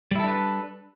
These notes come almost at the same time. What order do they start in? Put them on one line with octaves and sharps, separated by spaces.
G3 E4 A4 D4 B4